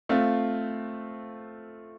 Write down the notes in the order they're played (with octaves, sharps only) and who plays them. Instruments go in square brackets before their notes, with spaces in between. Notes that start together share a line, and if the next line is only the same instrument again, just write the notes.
[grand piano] A3 C4 F4